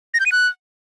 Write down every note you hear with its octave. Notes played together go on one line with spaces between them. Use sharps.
A#6
G6
D#7
F#6